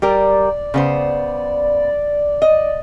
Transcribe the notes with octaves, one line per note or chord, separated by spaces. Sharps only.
G3 G4 A#4 D5
C#3 B3 C5
D#5